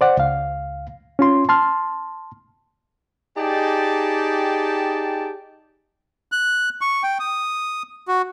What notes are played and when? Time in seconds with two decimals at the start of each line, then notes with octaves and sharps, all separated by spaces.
0.01 C5 D5 F#5
0.17 C#2 F5
1.19 C#4 F4 C6
1.49 A5 C6 F6
3.36 D#4 G4 G#4 D5 G5 A5
6.32 F#6
6.81 C#6
7.03 G5
7.20 D#6
8.08 F#4